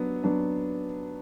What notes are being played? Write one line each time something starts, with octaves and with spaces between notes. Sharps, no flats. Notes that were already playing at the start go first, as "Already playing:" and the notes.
Already playing: F#3 B3 D4
F#3 B3 D4